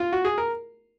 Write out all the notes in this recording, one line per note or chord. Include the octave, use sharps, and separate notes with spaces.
F4
F#4
G#4
A#4